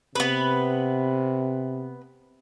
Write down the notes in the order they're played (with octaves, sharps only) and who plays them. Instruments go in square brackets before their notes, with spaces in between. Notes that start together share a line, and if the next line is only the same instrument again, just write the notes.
[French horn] C3 [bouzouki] B3 B4